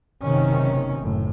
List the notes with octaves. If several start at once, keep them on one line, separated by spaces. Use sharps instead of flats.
F#1 C3 D#3 C#4
F#1 A2